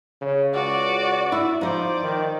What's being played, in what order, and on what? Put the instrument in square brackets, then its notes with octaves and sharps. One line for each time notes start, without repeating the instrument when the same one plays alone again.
[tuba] C#3
[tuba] C#2 [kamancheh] F#4 D5
[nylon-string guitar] E4
[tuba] F3 [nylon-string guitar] D#4 C5 [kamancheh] D5
[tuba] D#3